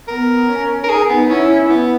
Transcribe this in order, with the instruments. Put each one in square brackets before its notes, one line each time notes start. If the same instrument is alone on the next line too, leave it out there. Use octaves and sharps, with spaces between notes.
[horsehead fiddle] B3 [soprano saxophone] A#4
[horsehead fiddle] C#4
[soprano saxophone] A#4
[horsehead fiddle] D#4 [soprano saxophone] G#4
[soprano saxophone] B3
[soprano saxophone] C#4 [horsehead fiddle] E4
[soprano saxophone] B3